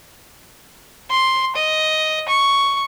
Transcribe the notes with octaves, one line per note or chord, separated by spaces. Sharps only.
C6
D#5
C#6